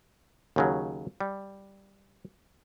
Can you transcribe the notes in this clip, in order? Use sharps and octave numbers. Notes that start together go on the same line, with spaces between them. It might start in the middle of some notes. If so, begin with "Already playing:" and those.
D#2 C#3 F#3
G3